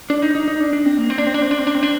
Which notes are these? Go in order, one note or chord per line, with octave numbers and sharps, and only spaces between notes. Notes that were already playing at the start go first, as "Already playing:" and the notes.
D4
D#4
D#4
D#4
D4
D4
C4
A#3
C4
D4
C4
D4
C4
D4
C4
D4
C4
D4